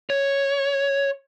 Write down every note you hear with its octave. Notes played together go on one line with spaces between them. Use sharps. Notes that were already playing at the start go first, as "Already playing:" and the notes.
C#5